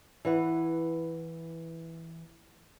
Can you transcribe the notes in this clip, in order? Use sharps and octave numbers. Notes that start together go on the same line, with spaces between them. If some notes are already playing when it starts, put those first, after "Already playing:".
E3 B4 F#5